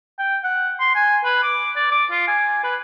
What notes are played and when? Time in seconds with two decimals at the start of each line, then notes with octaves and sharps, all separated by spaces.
0.19 G5
0.44 F#5
0.80 C6
0.95 G#5
1.25 B4
1.43 D6
1.76 D5
1.92 D6
2.12 F4
2.28 G#5
2.64 B4